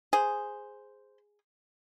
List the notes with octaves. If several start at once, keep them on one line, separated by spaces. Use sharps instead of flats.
G#4 C5